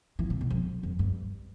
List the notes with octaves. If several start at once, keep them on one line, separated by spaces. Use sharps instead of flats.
E3
C3
B2
F2
F2
G2